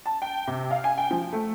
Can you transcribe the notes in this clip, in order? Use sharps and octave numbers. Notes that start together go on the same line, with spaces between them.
A5
G5
C3
F5
G#5
G5
F3
A3